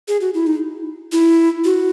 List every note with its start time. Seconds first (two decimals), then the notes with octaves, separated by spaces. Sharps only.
0.08 G#4
0.21 F#4
0.34 E4
0.47 D#4
1.12 E4
1.65 F#4